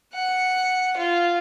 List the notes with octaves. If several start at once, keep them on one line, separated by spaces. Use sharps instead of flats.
F#5
F4